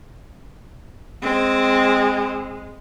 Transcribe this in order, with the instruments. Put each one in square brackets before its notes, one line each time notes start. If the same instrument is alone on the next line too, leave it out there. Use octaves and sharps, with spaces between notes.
[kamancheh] G#3 [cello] C4